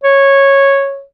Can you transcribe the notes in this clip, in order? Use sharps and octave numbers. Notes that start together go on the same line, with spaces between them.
C#5